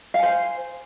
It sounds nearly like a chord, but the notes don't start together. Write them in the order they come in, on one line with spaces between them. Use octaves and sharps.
F5 G#5 C5